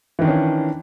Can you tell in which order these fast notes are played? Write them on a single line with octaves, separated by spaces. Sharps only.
E3 D#3 D4 C#4